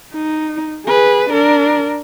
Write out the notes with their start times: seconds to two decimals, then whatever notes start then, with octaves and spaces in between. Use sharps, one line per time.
0.14 D#4
0.87 G#4 B4
1.30 D4 A#4